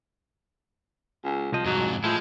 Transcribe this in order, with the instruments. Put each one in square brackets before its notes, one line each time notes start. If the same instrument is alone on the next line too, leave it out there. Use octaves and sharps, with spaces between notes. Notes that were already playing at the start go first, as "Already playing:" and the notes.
[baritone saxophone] C#2
[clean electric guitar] C2 D#5 [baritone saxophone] F3
[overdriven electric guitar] F2 G#2 [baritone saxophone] F#3
[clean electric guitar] A2 E4 [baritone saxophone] F3 [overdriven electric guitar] G#3